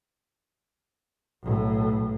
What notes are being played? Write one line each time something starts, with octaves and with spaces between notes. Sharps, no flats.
B1 A2